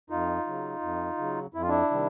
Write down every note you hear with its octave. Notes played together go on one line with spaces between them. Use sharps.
F2 D#4 F4
C#3 F#3
F2
C#3 F#3
F2 E4
F4
D4 E4
C3 D#3 G3